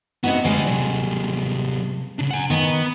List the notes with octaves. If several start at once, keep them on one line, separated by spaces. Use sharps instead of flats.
C3 B3 D#4 F#4
D2 G3 G#3 B3 D5
C3 F#3
C#3 D4
F#5 G#5
D#3 B3